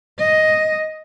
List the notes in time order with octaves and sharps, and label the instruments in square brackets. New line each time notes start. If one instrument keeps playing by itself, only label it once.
[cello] D#5